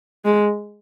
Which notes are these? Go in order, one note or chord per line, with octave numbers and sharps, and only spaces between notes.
G#3